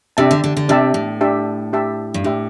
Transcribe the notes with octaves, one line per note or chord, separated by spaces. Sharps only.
C3 D4 G4 E5 A5
D3
D3
D3
C3 D4 G4 E5 A5
A2
D4 G4 E5 A5
D4 G4 E5 A5
G2
A2 D4 G4 E5